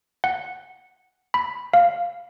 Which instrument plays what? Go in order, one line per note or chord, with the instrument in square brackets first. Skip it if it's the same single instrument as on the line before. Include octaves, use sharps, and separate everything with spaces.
[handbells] F#5
B5
F5